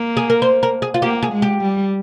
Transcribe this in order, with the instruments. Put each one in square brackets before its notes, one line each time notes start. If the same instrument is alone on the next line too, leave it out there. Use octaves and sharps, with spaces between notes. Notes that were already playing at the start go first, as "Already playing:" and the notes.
Already playing: [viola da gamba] A#3
[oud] G#4
A#4
C5
A#4
G#4
F4
[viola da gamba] A#3 [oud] G4
[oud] G#4
[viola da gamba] G#3
[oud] G4
[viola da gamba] G3